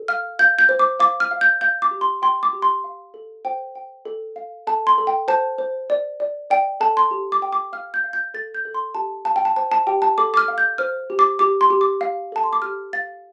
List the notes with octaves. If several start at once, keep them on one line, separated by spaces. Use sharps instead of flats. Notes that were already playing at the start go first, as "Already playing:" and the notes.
Already playing: A4
F5 F6
F5 G6
G6
C5
D6
F5 D6
F6
F5
G6
F5 G6
D6
G4
C6
G5 C6
D6
G4
C6
F5
A4
C5 G5
G5
A4
F5
A4 A5
C6
A4
G5
C5 A5
C5
D5
D5
D5 G5
A4 A5
C6
G4
D6
G5
D6
F5 F6
G6
F5
G6
A4 A6
G6
A4
C6
G4 A5
F5 A5
G5
A5
C5 A5
A5
G4 G5
A5
A4 D6
D6
F6
F5
G6
C5 F6
G4
D6
G4 D6
C6
G4
D6
F5
A4 A5
C6
D6
G4 F6
F5 A6